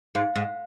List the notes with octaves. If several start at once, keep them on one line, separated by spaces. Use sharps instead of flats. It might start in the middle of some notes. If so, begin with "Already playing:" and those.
G#2 F5
G#2